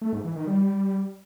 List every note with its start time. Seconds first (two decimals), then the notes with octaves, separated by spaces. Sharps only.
0.01 A3
0.13 G#2
0.24 E3
0.36 D#3
0.47 G3